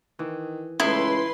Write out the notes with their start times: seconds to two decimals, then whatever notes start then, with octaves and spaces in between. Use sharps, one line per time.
0.19 D#3 E3
0.80 C#2 A2 E3 D#4 E4 B4 C6